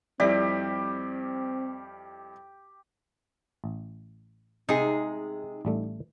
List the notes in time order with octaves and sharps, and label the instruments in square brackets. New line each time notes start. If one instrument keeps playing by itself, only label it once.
[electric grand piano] F2 G3 E4 [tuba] C4 [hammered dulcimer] G4 [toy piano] D5 E5
[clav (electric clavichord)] A1
[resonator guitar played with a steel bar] C3 G#3 G#4 [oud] D#4
[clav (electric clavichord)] A1 G3 A3